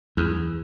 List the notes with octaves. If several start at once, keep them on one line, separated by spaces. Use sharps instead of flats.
E2